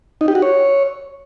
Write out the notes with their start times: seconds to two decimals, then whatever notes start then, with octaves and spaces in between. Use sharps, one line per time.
0.21 D#4
0.28 G4
0.35 F#4
0.42 C#5